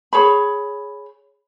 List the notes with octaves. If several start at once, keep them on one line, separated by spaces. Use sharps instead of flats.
G#4 C#5 B5